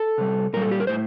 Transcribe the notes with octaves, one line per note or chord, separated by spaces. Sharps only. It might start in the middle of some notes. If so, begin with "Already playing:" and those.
Already playing: A4
C3 G3
A#2 G3 A#4
A4
G4
A#4
A2 C5